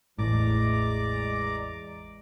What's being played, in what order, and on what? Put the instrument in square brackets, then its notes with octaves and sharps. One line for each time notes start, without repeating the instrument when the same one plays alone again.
[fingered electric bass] A1 E2 [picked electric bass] A2 [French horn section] E3 G#3 [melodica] D5 A#5 D6